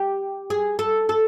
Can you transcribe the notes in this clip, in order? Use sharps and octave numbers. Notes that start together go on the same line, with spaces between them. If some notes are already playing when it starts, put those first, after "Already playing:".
Already playing: G4
G#4
A4
A4